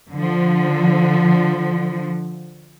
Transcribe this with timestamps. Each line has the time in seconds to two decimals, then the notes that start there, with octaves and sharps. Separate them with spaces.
0.12 D3 F3